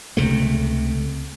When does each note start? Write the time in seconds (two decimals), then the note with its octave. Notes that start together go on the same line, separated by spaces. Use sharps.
0.17 C#2 C3 A3